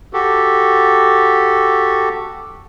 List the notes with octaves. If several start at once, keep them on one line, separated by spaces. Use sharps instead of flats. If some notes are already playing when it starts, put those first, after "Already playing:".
F#4 G4 A4